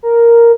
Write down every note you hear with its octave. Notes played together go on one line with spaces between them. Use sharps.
A#4